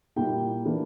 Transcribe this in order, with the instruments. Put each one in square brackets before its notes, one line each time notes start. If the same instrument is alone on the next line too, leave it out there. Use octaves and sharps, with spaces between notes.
[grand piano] A#2 G3 A#3 E4 G5
E3 A#3 D4